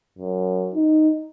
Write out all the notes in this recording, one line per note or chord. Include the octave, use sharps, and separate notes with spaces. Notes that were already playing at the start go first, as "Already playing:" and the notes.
F#2
D#4